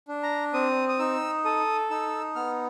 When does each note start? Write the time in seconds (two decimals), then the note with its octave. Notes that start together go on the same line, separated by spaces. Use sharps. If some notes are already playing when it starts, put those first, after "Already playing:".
0.08 D4
0.23 A#5
0.53 C4 D#6
0.89 D#6
0.99 D#4 E6
1.45 A4 D#6
1.90 D#4 E6
2.35 B3 F6